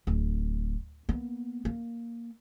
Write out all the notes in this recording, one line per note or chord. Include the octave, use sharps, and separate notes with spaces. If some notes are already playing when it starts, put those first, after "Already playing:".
D1
A#3 B3
A#3